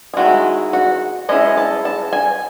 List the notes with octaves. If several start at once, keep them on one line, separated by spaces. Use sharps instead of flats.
G#4
D#3 G#3 C#4 E4 F#4
F#4
G#3 C#4 E4 D#5
A5
A5
G#5